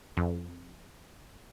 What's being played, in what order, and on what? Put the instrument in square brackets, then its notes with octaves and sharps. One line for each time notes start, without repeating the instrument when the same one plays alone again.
[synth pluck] F2